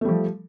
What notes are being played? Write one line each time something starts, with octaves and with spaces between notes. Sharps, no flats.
F3 G3 A3